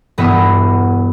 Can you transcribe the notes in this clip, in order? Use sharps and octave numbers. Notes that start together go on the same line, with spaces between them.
E1 G2 B3 D#5 E5 D#7